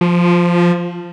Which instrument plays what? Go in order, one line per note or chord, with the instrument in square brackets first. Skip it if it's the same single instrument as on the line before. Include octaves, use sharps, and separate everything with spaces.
[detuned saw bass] F3